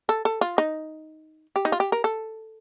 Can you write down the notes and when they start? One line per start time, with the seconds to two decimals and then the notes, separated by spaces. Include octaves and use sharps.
0.09 A4
0.25 A4
0.41 F4
0.58 D#4
1.56 G4
1.65 D#4
1.72 F4
1.80 G4
1.92 A#4
2.04 A4